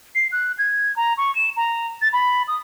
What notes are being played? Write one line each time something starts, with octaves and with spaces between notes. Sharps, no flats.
C7
F#6
G#6
A#5
C#6
E7
A#5
A6
B5
D#6